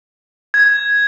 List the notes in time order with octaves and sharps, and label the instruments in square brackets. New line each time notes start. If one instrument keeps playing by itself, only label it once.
[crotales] G#6